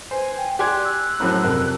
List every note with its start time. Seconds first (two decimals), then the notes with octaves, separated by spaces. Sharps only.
0.11 B4 C5 G#5
0.37 G5
0.59 G4 D5 G#5 C6 F#6 G#6
0.84 E6
1.20 A#1 F#2 A2
1.44 F2 C3 A#4